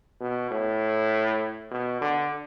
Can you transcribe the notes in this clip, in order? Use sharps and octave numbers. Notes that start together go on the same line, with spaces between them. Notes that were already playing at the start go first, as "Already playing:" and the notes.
B2
A2
B2
D3